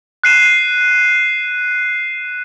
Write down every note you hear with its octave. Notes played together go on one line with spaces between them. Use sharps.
F#6 C7 D#7 E7